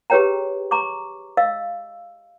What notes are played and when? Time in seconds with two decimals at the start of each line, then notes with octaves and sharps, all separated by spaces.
0.10 G4 G#4 B4 C#5 G5 A#5
0.71 A#5 C#6 D6
1.37 D#5 F5 E6